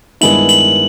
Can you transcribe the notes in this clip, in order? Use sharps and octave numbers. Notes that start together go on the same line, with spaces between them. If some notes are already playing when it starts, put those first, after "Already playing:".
G2 D#3 G#3 B3 E4 F#7
F#7